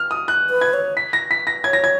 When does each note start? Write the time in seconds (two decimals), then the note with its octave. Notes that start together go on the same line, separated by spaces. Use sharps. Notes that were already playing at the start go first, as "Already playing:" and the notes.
Already playing: F6
0.11 D#6
0.28 F#6
0.50 B4
0.61 G#6
0.74 C#5
0.97 B6
1.13 A#6
1.31 B6
1.47 A#6
1.64 C#5 G#6
1.73 A#6
1.84 G#6